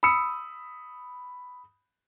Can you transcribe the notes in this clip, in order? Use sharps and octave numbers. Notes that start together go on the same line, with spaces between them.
B5 D#6 E6 C#7